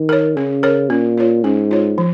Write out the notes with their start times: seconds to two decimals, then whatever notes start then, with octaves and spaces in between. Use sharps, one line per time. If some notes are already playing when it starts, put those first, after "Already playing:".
Already playing: D#3
0.09 A#4 C#5
0.36 C#3 C#4
0.63 A#4 C#5
0.90 A#2 C#4
1.18 F4 C#5
1.44 G#2 C#4
1.71 F4 C#5
1.98 F3